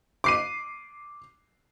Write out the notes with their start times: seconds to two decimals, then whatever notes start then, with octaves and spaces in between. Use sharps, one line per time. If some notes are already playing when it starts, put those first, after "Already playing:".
0.24 D6 C7 D#7